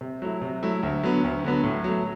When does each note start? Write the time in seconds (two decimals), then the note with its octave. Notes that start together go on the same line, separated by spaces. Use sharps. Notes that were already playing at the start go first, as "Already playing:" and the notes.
0.01 C3
0.22 F#3 A3 E4
0.42 C3
0.63 F#3 A3 E4
0.83 D2
1.03 D3 F#3 B3
1.24 D2
1.44 D3 F#3 B3
1.64 A2
1.84 F#3 A3